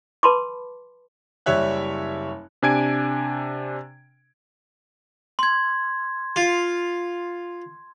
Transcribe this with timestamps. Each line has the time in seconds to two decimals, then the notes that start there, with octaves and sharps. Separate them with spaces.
0.23 B4 A5 B5 C6 D6
1.46 F#1 G3 C#5 E5 F#6
2.62 C3 D4 G#5 G#6 D7
5.39 C6 G#6
6.36 F4